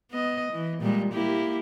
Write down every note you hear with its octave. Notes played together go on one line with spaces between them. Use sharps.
B3 D#5
E3
A#2 G3 G#3
A#3 E4 G4